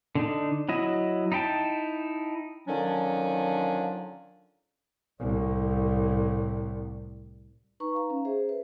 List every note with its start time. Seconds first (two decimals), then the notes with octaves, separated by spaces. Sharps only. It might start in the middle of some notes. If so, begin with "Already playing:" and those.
0.15 D3 D4 D#4
0.69 F#3 E4 D#5
1.32 D#4 E4 G5 A5
2.68 D3 D#3 F3 F#3 C#4 D4
5.20 C2 A2
7.80 D#4 B4 A#5 C#6
7.94 F5 A#5
8.10 C#4
8.25 G#4 C5 E5
8.49 B4